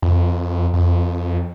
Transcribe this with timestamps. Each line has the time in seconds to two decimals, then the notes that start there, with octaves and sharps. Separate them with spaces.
0.02 F2
0.73 F2